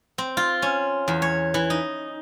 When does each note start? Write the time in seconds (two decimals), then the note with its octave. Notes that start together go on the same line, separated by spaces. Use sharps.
0.18 C4
0.37 F4
0.62 C#4
1.08 E2
1.22 C#5
1.54 E3
1.70 D#4